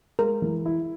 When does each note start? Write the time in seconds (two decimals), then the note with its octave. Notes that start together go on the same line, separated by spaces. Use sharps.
0.19 G#3 A#4
0.42 E3
0.65 E4